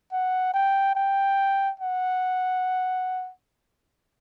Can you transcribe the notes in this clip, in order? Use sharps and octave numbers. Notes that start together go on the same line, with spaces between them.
F#5
G5
G5
F#5